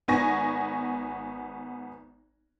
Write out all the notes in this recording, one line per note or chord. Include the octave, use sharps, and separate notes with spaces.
G#1 B3 G#5 C#6 A#6